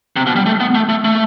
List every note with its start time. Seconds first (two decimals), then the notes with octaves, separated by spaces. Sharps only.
0.16 C3
0.27 B2
0.36 G3
0.46 A3
0.60 B3
0.75 A3
0.89 A3
1.05 A3